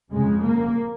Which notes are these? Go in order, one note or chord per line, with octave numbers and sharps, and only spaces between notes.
F2 C#3 G#3
A#3